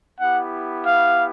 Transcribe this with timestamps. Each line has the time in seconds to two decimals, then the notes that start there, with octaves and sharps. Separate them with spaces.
0.19 B3 E4 G4 F#5
0.85 F5